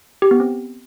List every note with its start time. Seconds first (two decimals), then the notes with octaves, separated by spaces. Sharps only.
0.22 G4
0.31 B3
0.40 C4